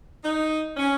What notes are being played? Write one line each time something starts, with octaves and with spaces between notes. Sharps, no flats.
D#4
C#4